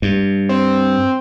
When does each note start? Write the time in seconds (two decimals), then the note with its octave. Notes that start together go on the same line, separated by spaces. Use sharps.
0.02 G2
0.49 C4